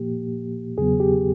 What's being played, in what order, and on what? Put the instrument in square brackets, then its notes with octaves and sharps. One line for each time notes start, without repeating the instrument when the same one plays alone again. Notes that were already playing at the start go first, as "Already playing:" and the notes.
Already playing: [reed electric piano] A#2 F3 A#3 G4
E2 C#3 F#3 B3 G#4
G4